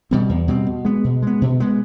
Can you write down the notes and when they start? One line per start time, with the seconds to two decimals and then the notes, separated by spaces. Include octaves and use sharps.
0.11 B2 G3 C4
0.29 E2
0.48 B2 G3 C4
0.67 B2
0.85 G#3 B3
1.04 B2
1.22 G#3 B3
1.42 B2
1.60 G#3 B3